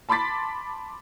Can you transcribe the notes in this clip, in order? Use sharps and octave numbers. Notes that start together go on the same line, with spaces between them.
A5 B5 C6 D6 A6 B6